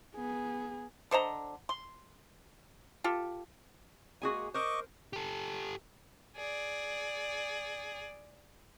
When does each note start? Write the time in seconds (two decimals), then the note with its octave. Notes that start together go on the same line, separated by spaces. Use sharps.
0.15 B3 G#4
1.11 D3 C5 D#5 A#5
1.69 C6
3.04 F4 G4 A4
4.22 G#3 A#3 F#4 G#4 G#5
4.54 A#4 C5 D#5 C#6 D6
5.13 G4 A4
6.36 G#4 D5